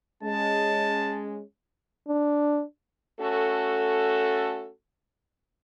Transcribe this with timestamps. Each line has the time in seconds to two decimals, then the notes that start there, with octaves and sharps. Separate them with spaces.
0.23 G#3 C#4 A5
2.08 D4
3.20 A3 C#4 F#4 A4